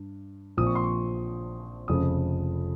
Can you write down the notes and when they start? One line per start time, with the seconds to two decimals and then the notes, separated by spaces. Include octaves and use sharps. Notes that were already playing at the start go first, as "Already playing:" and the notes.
Already playing: G2
0.57 A#1 A#2 F3 C4 D#6
0.67 C#6
0.75 C6
0.84 C#6
1.88 F1 F2 C#3 D#6